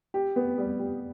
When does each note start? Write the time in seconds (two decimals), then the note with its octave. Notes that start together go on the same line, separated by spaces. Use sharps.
0.14 G4
0.36 B3
0.58 G3
0.79 G4